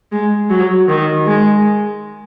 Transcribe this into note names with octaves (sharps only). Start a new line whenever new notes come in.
G#3
F#3
D#3
G#3